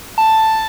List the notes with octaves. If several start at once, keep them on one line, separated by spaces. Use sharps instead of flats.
A5